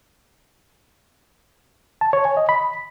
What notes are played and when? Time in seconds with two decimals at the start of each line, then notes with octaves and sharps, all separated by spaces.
2.01 A5
2.13 C#5
2.25 G#5
2.37 D#5
2.49 B5